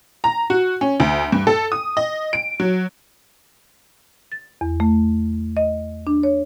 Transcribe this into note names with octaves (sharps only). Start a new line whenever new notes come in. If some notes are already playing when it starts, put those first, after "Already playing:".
A#5
F#4
C#4
D2
G2
A4
D#6
D#5
D7
F#3
A6
E2
A3
D#5
D4
C#5